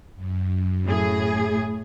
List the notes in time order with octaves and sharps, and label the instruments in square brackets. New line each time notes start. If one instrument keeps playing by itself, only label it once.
[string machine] F#2
[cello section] A2 G#4